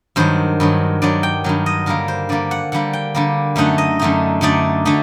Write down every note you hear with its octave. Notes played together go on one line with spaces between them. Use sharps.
G2 D#3 F#3 C5
G2 D#3 F#3
G2 D#3 F#3 D5
G5
G2 D#3 F#3
D#5
D3 G3 A#3 A#4
C5
D3 G3 A#3 D5
F#5
D3 G3 A#3 F#5
G5
D3 G3 A#3
F#2 D3 A3 D#4 F#5
D#5
F#2 D3 A3 D#4
F#2 D3 A3 D#4 D5
D3 A3 D#4